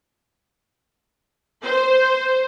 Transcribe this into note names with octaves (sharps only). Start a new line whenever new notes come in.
C5